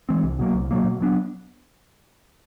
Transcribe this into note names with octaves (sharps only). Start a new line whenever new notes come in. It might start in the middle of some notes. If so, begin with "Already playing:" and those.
E3 G#3 C4
C2
B2 F#3 A#3
C2
B2 F#3 A#3
B2
F#3 B3 D4